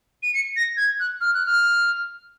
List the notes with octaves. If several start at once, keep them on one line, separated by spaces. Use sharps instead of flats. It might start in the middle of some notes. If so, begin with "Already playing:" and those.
D#7
C#7
A#6
G#6
F#6
F6
F#6
F6